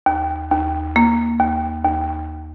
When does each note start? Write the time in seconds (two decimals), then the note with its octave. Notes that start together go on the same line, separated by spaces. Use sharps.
0.06 D#2
0.51 D#2
0.96 A#3
1.40 D#2
1.85 D#2